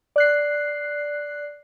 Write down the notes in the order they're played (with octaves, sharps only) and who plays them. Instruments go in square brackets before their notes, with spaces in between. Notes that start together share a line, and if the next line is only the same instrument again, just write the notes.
[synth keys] D5 F#6 C7